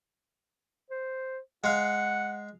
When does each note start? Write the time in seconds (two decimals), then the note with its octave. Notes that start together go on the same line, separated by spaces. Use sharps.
0.90 C5
1.64 G#3 F5 F#5